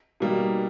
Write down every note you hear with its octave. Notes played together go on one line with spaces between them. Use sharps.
B2 G3 A#3 D#4